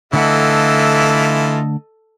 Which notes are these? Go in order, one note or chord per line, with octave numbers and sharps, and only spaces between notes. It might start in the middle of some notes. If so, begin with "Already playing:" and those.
D3 E3 A3 E4 F4 A4 D#5 F#5